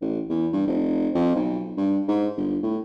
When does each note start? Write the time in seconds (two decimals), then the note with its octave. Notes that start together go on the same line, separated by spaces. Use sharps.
0.01 A1
0.30 E2
0.53 G2
0.67 F1
1.15 F2
1.35 B1
1.77 G2
2.08 G#2
2.37 G1
2.63 A2